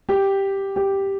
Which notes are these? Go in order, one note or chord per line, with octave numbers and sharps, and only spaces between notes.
G4
G4